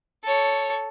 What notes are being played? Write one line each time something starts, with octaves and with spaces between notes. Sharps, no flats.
A4 C#5